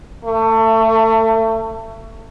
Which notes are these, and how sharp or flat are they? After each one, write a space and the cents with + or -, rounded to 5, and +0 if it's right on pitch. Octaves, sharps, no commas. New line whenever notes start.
A3 +25